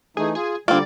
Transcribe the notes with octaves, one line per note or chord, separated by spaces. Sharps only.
E3 A3 D#4 G#4
F4 G#4
D3 G3 A#3 C4 D4 F4 D5